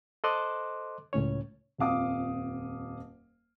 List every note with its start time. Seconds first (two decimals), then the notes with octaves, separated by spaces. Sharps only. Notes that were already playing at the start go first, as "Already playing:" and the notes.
0.24 A4 C5 D#5 C6 D6 F#6
1.13 C#2 A2 C#4 C#5
1.78 D#1 F2 F5 D6 D#6